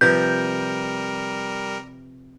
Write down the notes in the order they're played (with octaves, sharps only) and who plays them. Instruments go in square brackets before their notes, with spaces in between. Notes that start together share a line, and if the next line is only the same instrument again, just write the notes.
[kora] C3 F3 [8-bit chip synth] G3 A#4 [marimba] B4 [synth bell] G6